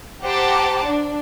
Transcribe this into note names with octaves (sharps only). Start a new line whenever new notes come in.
G4 C5 F#5 A5 A#5 D6
D4